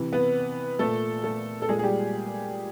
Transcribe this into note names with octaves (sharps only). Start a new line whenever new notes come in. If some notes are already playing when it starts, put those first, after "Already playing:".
Already playing: C3 E3
B3 B4
A#2 A3 A4
A3 A4
A4
A#2 G#3 G#4
G#4
G3 G4